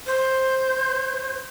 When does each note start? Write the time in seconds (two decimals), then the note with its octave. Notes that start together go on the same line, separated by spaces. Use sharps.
0.06 C5